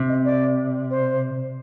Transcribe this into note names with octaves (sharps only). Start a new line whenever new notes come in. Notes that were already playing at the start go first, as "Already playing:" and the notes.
Already playing: C3
D#5
D5
C5